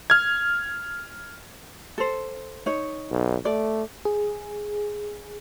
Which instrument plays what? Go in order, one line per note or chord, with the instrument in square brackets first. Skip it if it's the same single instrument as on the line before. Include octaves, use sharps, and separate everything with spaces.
[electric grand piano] F6 G#6
[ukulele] A4 C5
D#4 C#5
[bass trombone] B1
[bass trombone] A3 [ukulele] D5
[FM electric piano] G#4